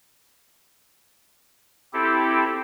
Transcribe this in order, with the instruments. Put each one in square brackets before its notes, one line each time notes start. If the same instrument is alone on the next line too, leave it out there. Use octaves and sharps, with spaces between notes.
[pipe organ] C4 E4 G4 A4